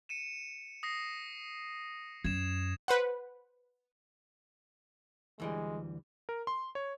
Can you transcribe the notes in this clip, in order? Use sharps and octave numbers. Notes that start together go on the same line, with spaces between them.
C#7 D#7 E7
D#6 A#6 C7
F#2 G#6 E7
B4 C5 F#5
D2 E3 G3 G#3
A#4
C6
C#5